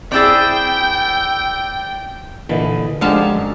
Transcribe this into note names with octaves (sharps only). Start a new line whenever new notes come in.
C4 E4 G#4 D5 G5 E6 A6
A#2 D3 E3 B4 D#5
D3 F3 G#3 D#4 G4 F5 A5
F#2